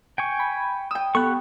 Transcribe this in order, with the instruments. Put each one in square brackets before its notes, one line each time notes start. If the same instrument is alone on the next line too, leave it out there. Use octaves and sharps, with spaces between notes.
[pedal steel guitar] G5 G#5 C#6
[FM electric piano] B5
[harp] G5 E6 [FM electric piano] D#6
[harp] B3 [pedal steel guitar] G4 F#5 C#6 [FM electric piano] A4